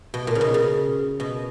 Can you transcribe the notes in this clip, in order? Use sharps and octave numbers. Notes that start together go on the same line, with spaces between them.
B2
A#2
C#3
B2
C#3
B2